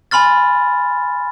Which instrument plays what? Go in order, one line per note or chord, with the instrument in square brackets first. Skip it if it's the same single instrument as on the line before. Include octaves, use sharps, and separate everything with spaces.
[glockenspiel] G#5 B5 C6 F6 A6